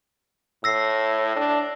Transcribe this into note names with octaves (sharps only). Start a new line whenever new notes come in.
A2 E6 A#6 C7
D4